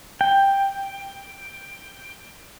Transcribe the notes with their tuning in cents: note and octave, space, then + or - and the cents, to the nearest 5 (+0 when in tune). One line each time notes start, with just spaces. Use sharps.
G5 +10